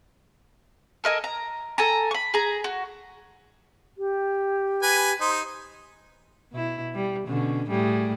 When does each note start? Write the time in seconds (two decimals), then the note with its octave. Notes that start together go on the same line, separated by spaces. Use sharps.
1.04 A4 A#4 D#5 G#5
1.24 A#5
1.78 A4 G#5 A#5
2.11 B5 C#6
2.34 G#4 A#5
2.64 F#4
3.98 G4
4.83 B4 G#5
5.21 D#4 C5
6.52 B2 E4
6.95 G3
7.27 B2 D3 C#4
7.69 A2 G3 G#4